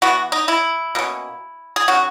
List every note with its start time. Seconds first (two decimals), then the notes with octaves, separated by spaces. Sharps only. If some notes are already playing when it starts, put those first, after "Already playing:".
0.02 E3 B3 F#4
0.32 D#4
0.48 E4
0.95 B2 A#3 C#4
1.76 G#4
1.88 D#3 F#3 C#4 F#4